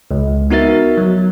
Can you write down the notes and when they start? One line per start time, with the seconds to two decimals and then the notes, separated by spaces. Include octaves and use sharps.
0.11 C#2
0.50 B3 D#4 F#4 A#4 E5 A6
0.98 F#3